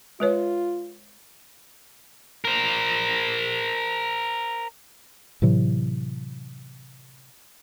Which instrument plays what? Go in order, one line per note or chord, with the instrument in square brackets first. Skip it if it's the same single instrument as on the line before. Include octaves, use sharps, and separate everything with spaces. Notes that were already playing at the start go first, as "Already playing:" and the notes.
[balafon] G#3 B4 C#5 [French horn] F4
[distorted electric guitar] A#4 C5
[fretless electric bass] A2 C3 E3 F#3